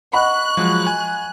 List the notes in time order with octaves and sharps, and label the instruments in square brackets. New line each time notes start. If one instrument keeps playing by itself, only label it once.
[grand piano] D#5 F#5 B5 [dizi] C#6 [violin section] F#6
[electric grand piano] F3 F#3 G#3
G#5